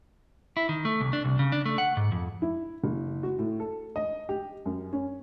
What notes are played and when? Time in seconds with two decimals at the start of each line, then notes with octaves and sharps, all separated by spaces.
0.57 E4
0.69 D#3
0.85 A3
1.00 C2
1.13 D4
1.25 C2
1.39 C#3
1.52 D4
1.66 A3
1.78 F#5
1.97 G#2
2.12 F2
2.42 E4
2.84 F#1
3.23 F#4
3.39 A2
3.60 A4
3.96 D#5
4.29 G4
4.66 F#2
4.93 C#4